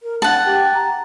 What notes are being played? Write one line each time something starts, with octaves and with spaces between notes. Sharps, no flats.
A#4
D4 F#5 A5
G4 G5
A#5